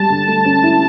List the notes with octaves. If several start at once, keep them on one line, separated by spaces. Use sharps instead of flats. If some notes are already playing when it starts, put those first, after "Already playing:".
Already playing: G3 A5
D3
A3
C#4
E4